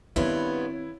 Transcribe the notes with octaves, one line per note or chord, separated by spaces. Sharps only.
G2 D#3 B3 C4 E4 F4 C#5